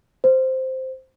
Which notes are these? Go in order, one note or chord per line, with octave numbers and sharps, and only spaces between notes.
C5